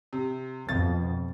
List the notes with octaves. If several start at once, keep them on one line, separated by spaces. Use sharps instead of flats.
C3
F2 B2 A6